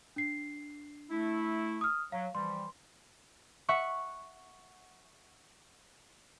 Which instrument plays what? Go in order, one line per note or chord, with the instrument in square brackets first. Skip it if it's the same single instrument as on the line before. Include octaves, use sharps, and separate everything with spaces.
[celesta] D4 C7
[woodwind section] A3 E4
[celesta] D#6 F6
[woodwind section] F#3 [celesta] F5
[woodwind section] E3 F3 G3 [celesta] C6
[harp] E5 F#5 C#6